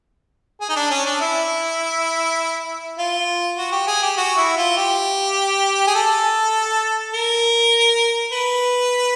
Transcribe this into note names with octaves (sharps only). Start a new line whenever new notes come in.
G#4
D#4
D4
C#4
D4
E4
F4
F#4
G4
G#4
G4
F#4
E4
F4
G4
G#4
A4
A#4
B4